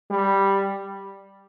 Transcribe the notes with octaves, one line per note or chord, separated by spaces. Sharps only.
G3